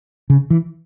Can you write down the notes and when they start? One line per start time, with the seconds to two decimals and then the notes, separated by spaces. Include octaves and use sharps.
0.30 C#3
0.50 E3